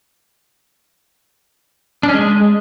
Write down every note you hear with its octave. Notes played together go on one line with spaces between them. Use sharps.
D4
C#4
G#3